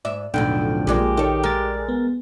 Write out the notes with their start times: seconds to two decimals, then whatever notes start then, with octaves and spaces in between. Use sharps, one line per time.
0.05 G#2 D5 E5
0.34 B1 F2 A2 D3 F#3 G5
0.87 A#1 F3 G#3 A#3 G4 G#4 D5
1.17 D#3 A4 C#5
1.44 G#3 A#4 A6
1.89 B3